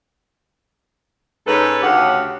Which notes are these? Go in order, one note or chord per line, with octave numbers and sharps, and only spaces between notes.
G#2 C#4 A4 B4
D2 C#3 G4 F#5